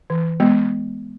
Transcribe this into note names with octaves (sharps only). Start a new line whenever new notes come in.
E3
G#3 B3